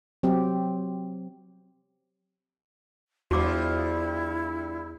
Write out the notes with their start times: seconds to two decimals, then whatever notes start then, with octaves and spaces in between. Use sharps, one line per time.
0.23 F#3 C4 G4
3.31 E2 G2 F3 E4 F#4 D6